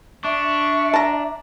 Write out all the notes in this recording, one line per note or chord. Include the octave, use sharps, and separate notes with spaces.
D4 E5 C#6
A5 A#5